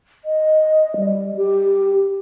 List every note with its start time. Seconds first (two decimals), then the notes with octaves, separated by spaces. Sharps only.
0.25 D#5
0.97 G3
1.36 G4